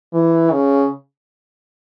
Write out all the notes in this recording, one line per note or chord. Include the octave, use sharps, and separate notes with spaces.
E3
C#3